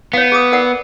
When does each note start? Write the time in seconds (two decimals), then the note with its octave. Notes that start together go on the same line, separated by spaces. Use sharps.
0.13 B3 C#5 F5
0.32 G#4 D6 D#6
0.52 A#4 D5 F#5